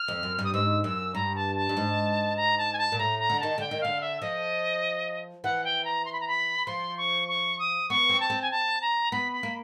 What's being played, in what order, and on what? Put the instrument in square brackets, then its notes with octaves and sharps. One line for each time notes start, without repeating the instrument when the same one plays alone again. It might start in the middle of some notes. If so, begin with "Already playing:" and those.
Already playing: [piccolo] F6
[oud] F2
F#2
G2
[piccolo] D#6
[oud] G#2 [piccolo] E6
[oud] F#2 [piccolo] E6
[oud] G2 [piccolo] A#5
[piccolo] A5
A5
[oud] G2
G#2
[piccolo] A#5
A5
G#5
A5
[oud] A#2
[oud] A2 [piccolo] A#5
[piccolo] A#5
[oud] D3
[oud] D#3 [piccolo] A5
[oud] D3 [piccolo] G5
[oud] D#3
[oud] D3 [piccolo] F5
[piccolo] E5
[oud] F3 [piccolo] D#5
[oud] E3 [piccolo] F#5
[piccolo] G5
A#5
C6
B5
A#5
B5
[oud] F3 [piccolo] C6
[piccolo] C#6
C#6
D#6
[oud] B3 [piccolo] C#6
[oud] C4
[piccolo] A5
[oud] C4
[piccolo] G#5
A5
A#5
[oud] B3 [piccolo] B5
[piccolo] B5
[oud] A#3